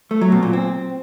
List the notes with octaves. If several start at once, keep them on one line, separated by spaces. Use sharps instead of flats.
A3
F#3
B2
A#2
C4